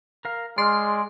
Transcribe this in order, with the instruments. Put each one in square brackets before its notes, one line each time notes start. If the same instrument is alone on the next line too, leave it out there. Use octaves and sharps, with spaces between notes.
[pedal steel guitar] A#4 F5
[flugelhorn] G#3 [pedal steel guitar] D5 F6 [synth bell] C6